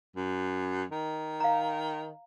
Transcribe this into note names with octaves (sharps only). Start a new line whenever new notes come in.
F#2
D#3
F5 A#5